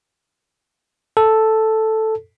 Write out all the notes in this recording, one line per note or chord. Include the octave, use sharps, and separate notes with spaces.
A4